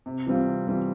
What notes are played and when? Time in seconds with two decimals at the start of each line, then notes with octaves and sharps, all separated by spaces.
0.06 C3
0.26 E3 G3 C4 F4
0.47 C3
0.67 E3 G3 C4 F4